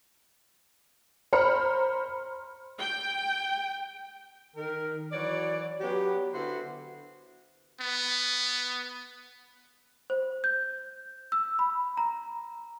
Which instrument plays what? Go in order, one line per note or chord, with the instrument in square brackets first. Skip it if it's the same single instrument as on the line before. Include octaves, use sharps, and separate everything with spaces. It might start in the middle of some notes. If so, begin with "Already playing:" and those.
[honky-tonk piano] C5 A#5 B5 F6 C#7
[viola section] G5
[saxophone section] D#3 A#4
E3 F#3 F#4 C#5 D5
F#3 B3 C#4 G4
D3 B3 E4 F#4 A4 C5
[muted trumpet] B3
[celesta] C5
G6
E6
B5
A#5